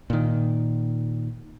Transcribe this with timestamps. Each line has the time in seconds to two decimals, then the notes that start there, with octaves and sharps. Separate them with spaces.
0.10 A#2 D#3